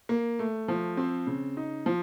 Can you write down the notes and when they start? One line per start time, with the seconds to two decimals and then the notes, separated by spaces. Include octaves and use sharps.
0.09 A#3
0.39 A3
0.68 F3
0.97 C4
1.27 C#3
1.57 D#4
1.86 F3